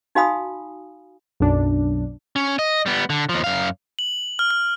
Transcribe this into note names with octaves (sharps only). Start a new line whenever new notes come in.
D#4 F#4 F5 G#5 B5 D#6
B1 F#2 D4
C#4
D#5
G3 B3
D3
D#2 F3
F#2 F5
F#7
F6
F6